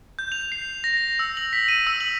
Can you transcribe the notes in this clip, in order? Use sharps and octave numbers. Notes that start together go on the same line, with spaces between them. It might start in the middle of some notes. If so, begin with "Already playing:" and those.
G6
F7
C7
A#6
A#6
E6
F#7
B6
D#7
E6
F#7